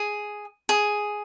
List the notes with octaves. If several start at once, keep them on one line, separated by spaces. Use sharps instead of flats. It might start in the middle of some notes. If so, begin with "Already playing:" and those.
Already playing: G#4
G#4